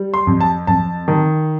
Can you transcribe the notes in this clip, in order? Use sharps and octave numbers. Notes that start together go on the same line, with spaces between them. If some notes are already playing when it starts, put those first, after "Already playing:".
Already playing: G3
C6
F2
A5
F2 A5
D#3